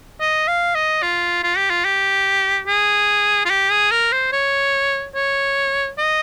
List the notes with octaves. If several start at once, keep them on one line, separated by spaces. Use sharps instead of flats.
D#5
F5
D#5
F4
F4
G4
F4
G4
G#4
F4
G4
G#4
A#4
C5
C#5
C#5
D#5